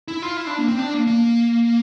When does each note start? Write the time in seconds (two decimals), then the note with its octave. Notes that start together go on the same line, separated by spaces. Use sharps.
0.08 E4
0.22 F4
0.37 E4
0.47 D4
0.58 A#3
0.68 C4
0.79 D4
0.94 A#3
1.07 A#3